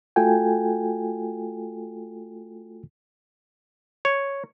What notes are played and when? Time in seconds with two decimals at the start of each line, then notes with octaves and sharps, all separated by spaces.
0.16 A3 F4 F#4 A4 G5 G#5
4.05 C#5